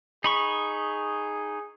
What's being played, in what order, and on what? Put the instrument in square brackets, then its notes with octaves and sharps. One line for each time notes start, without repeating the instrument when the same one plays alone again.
[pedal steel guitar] D#4 B5 C#6 [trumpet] G#4